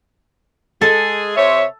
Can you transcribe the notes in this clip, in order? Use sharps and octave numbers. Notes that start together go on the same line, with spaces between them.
G#3 G#4 A4
C3 C5 C#5 E5